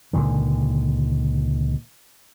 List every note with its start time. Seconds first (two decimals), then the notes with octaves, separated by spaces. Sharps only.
0.13 C#2 A#2 D3 D#3